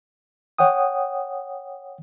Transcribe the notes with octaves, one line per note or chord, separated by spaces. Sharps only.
C#5 F#5 G5 D#6